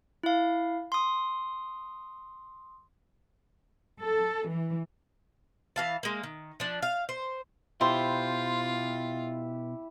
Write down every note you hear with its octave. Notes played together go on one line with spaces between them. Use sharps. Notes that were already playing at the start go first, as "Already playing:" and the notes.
E4 F5
C6 D#6
A4
E3
E3 F5 A5
G#3 A#3
D#3
F3 D4
F5
C5
B2 E4 F4 G4 C5